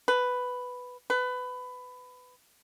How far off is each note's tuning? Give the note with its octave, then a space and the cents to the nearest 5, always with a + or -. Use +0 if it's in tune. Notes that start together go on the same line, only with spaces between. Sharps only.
B4 +5
B4 +20